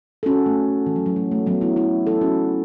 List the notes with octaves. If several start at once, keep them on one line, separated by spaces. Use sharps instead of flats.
A4
C#4 F#4
A3
E3
F#3
F#3
A3
A3
F#3 B3
B3 E4
B3 E4
E4 A4
C#4 F#4